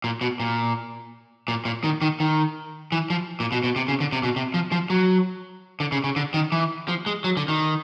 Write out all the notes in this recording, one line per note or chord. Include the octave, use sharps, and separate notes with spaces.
A#2
B2
A#2
A#2
A#2
D#3
D#3
D#3
E3
F3
A#2
B2
B2
C3
C#3
D3
C3
B2
C3
F3
F3
F#3
D3
C#3
C#3
D3
D#3
E3
F3
G#3
F#3
D3
D#3